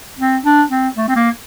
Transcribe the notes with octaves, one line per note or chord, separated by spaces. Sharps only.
C4
D4
C4
A3
C4
A#3